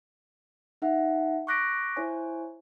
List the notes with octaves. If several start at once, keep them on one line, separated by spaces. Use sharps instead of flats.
D#4 E5 F#5
C#6 D6 F#6 A#6 B6 D7
E4 C5 C#5 G#5